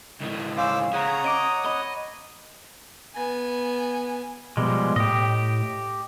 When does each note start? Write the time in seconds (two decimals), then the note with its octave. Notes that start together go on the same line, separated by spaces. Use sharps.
0.21 C#2 A2
0.57 C#4 C5 F5 D6 E6
0.93 C#3 C#5 F#5 A#5 D#6
1.25 D#5 D6 D7 D#7
1.66 D#5 B5
3.16 B3 G#5
4.57 B2 F3 G3 G#3
4.96 A2 G4 D#5